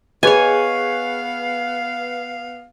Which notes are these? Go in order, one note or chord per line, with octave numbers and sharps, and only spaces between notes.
B3 G#4 B4 C#5 D#5 F5 G#5